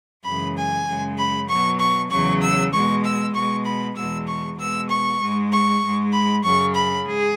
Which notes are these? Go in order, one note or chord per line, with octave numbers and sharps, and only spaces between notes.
F#2 C#3 E3 G#3 B5
G#5
F#2 C#3 G#3
B5
B2 F#3 C#6
C#6
E2 C#3 F#3 C#6
E6
B2 G#3 C#6
E6
B2 G#3 C#6
B5
E2 B2 G#3 E6
C#6
B2 G#3 E6
C#6
G#2 G#3
C#6
G#2 G#3
B5
F#2 C#3 F#3 C#6
B5
G#2 G#4